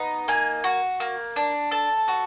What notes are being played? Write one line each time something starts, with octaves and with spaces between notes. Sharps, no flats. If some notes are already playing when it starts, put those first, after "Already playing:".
Already playing: B3 D#4
A#3 G#5
F#4
A#3
D4
A4 A5
F#4